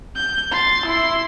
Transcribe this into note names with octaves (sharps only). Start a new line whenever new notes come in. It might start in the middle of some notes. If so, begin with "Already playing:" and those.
G6
C6 A6
E4 C6